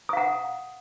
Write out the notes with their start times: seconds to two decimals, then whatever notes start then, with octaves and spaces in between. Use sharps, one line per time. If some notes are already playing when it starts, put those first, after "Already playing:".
0.09 D#6
0.13 F5
0.17 F#5